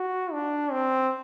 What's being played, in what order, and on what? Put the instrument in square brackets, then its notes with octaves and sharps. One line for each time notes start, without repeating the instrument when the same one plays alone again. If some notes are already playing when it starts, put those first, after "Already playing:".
Already playing: [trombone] F#4
D4
C4